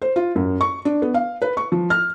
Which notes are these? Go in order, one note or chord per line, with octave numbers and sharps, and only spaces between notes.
C5
F4
F#2
C#6
D4
B3
F5
B4
C#6
F3
F6